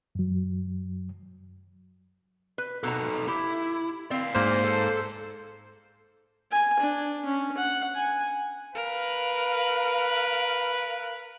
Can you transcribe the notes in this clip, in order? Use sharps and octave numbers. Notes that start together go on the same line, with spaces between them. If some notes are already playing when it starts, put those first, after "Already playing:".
F#2 F#3
B4
B2 D#4 A4 A#5
E4 G4
C4 D5 F5
G#2 A#3 C5
A4
G#5
D4
C#4
F#5
G#5
A#4 B4 F5